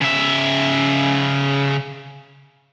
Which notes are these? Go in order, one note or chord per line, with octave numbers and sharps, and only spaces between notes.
C#3 E5